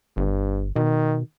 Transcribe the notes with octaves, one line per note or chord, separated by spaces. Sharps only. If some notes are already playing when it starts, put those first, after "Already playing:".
G1 G2
B2 D#3